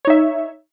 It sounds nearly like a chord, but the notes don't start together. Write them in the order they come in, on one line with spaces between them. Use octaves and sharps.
C#5 D#4 E5